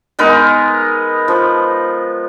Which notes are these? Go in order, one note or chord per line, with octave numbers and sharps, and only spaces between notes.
G#3 B3 D#4 A#4
F3